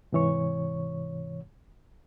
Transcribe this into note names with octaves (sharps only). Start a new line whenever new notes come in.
G#2 C3 E3 C#5 C#6